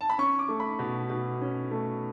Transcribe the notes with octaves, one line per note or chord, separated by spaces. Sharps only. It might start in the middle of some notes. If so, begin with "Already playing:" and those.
A5
B5
C#4 C#6
D6
A3
B5
B2
B2
C#4
A3